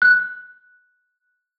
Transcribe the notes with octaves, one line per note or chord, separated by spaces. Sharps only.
F#6